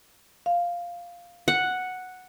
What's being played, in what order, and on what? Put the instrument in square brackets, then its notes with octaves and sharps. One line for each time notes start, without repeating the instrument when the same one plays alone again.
[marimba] F5
[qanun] F#5